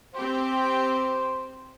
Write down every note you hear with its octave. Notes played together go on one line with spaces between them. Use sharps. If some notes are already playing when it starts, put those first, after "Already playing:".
C4 G4 C5